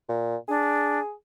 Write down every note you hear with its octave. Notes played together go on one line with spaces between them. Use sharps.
A#2
D4 G#4